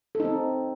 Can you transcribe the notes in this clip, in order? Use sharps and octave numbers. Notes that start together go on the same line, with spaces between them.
C4 D#4 A4